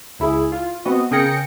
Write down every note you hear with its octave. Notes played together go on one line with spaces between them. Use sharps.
C#2 E4 G#4
F4
B3 C4 F#4 D#5
C#3 G#4 A#4 G5 A#6 C#7